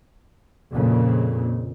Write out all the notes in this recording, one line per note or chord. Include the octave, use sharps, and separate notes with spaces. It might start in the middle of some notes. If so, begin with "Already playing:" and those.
F2 A#2 C#3